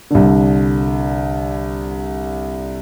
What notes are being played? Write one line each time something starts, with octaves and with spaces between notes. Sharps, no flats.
C2 D3